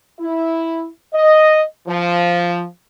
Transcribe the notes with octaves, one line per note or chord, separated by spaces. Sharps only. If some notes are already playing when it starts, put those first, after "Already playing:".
E4
D#5
F3